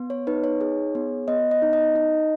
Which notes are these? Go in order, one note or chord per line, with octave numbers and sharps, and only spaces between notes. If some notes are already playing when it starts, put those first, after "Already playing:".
Already playing: B3
C#5
D#4 B4
C#5
G#4
B3
B3 D#5
D#5
D#4
D#5
D#4